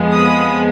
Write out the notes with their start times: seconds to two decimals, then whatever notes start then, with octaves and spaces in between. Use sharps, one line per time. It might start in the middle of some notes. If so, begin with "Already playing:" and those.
Already playing: F2 F3 G#3 B3
0.13 B5 D#6